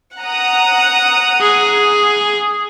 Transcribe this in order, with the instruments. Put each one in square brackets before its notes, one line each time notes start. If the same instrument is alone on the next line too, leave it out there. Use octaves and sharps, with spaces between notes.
[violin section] F#5 A#5 D#6
[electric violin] G#4